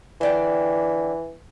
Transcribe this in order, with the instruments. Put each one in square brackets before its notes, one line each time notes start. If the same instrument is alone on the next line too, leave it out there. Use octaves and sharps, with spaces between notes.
[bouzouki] D3 D5 G5 [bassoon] E3